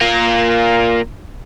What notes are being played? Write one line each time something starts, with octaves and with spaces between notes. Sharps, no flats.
A#3 F4